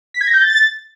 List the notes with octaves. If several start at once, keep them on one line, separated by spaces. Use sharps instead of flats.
B6
G#6
A#6
G6
A6